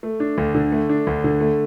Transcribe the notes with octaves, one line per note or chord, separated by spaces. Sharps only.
A3
D4
D2
D3
A3
D4
D2
D3
A3